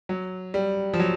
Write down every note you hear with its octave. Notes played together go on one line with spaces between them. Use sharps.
F#3
G3
F3
F#3